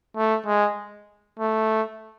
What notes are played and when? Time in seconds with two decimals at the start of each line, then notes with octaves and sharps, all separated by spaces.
0.17 A3
0.47 G#3
1.39 A3